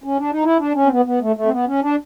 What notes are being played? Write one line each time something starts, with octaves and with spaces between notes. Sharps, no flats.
C#4
D4
D#4
E4
D4
C#4
C4
B3
B3
A3
A3
C4
B3
C#4
D4